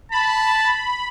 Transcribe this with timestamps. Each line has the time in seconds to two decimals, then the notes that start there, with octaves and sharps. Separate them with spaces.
0.12 A5 B5